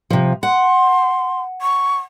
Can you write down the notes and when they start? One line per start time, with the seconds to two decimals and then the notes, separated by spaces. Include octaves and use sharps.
0.10 C3 F3
0.43 F#5 C6
1.62 C#6